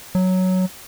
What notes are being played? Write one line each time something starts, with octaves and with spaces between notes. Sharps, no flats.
F#3